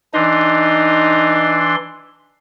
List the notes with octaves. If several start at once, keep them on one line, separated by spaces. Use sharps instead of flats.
E3 D4 D#4 C6